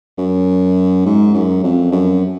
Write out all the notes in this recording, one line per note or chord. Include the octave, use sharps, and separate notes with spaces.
F#2
G#2
F#2
F2
F#2